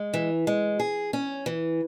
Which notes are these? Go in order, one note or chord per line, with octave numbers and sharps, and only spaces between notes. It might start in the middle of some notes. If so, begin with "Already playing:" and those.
Already playing: G#3
E3
G#3
G#4
C#4
E3